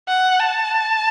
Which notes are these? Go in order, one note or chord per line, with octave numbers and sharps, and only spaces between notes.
F#5
A5